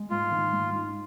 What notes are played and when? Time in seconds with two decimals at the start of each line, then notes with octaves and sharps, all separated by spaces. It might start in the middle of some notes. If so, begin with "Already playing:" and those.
Already playing: G#3
0.10 G#2 F4
0.31 D#3
0.53 G#2
0.74 D#4